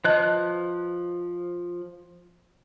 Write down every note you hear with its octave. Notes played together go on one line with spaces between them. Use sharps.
F3 B4 D#5 A5 F#6